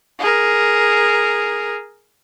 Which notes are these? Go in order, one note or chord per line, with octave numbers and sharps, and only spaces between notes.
G#4 A#4